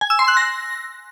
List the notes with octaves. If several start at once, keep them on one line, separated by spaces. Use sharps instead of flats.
G#5
E6
C6
F#6
A#6